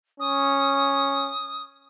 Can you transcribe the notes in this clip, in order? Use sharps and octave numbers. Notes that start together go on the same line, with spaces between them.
C#4 D#6